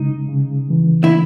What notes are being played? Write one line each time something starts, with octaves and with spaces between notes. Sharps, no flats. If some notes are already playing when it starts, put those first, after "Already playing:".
Already playing: C#3 G#3 D#4
C#3
E3
E4